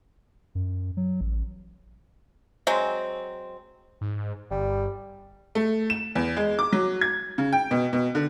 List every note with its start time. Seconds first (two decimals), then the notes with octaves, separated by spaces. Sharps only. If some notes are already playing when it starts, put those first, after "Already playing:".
0.55 F#2
0.97 F#3
1.21 A1
2.67 F#3 G#3 C4
4.01 G#2
4.51 G1 G3
5.55 A3
5.90 E7
6.15 E2
6.37 G#3
6.59 D6
6.73 F#3
7.01 G#6
7.38 C#3
7.53 G5
7.71 B2
7.93 B2
8.15 D3